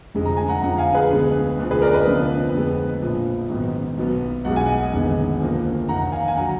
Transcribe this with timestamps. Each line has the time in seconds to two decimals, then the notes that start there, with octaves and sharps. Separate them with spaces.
0.14 F1 F2 D3 G#3
0.26 A#5
0.37 G#5
0.48 F#5 A#5
0.62 F2 D3 F3 F#5 A#5
0.78 F5 G#5
0.95 G#4 B4
1.10 D2 D3 G#3 B3
1.59 D2 D3 F3
1.71 G#4 B4
1.82 A#4 D5
1.94 B4 D#5
2.07 F1 F2 D3 F3 B3
2.54 F2 D3 G#3 B3
3.02 A#1 A#2 F3
3.49 G#1 G#2 F#3 B3
3.97 B1 B2 F#3 B3
4.45 B1 B2 G#3 F#5
4.56 G#5
4.66 D#5 F#5
4.93 F1 D#2 D3 G#3 B3
5.40 D2 D3 F3 A#3
5.88 F1 D#2 D#3 F#5 A#5
6.12 F5 G#5
6.28 G#5
6.36 D3 F#3 F#5 A#5